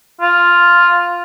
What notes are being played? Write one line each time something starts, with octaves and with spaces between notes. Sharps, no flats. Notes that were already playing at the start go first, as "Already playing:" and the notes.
F4